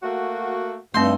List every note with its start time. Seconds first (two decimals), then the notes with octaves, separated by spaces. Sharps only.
0.03 A3 A#3 F#4
0.94 G2 A3 C4 D#4 E5 C6